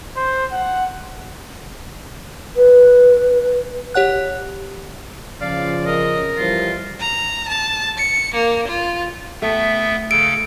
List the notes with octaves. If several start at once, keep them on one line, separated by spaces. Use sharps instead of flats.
C5
F#5
B4
G4 C#5 F#5 F#6
C#3 F3 D5 F5
A#4 D#5
E3 F3 G3 F4
A#5
A5
C#7
A#3
F4
A3 B3 E5 G5
C#3 A4 D7